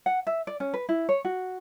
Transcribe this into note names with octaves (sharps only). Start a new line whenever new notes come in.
F#5
E5
D5
C#4
B4
E4
C#5
F#4